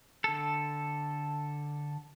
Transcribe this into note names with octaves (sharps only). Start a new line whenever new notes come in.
D3 A4